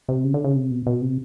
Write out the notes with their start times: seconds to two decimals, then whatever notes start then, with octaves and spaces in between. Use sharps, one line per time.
0.08 C3
0.24 C#3
0.34 D3
0.44 C#3
0.56 C3
0.71 B2
0.87 B2
1.02 C3